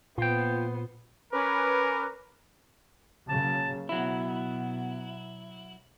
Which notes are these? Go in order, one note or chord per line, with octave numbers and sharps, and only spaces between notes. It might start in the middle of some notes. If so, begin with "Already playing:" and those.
A#2 B3 F4 C5 G5
C#4 A#4 B4 G#5 D6
C#3 F#3 A#3 A5
B2 F#3 B3 E4